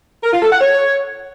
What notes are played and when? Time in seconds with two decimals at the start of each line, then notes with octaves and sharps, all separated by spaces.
0.24 A#4
0.33 F4
0.42 A4
0.52 F#5
0.61 C#5